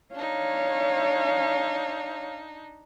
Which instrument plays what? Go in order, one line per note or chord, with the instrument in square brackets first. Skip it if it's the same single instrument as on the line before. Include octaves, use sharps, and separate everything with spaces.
[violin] D4 D#4 [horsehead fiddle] C#5 F5